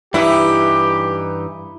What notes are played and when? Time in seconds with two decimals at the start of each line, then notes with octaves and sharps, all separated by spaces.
0.14 G2 E3 D#4 E4 G4